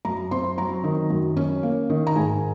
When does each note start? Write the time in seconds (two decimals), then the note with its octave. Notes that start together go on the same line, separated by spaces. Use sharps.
0.05 F#2 A#5
0.31 C4 C6
0.58 F#3 A#5
0.84 D#3
1.10 F#2
1.37 C#4
1.63 A#3
1.90 D#3
2.07 A#5
2.16 G#2 G#5